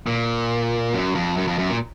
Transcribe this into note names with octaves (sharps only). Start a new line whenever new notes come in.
A#2
F#2
F2
F#2
F2
F#2
A#2